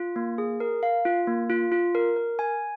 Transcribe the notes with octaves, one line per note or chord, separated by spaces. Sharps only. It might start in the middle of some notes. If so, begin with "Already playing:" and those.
Already playing: F4
A#3
G#4
A#4
F5
F4
A#3
F4
F4
A#4
A#4
G#5